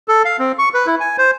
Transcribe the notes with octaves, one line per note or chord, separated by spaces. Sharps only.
A4
F5
C4
C#6
B4
E4
G#5
C5